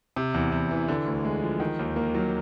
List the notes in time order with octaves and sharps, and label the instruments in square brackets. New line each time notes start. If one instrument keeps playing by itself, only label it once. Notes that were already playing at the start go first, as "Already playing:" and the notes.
[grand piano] C3
E2
E2
E3
D3
D2
G#3
F3
D#3
D#2
A#3
F#3